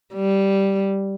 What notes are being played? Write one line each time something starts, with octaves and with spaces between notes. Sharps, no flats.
G3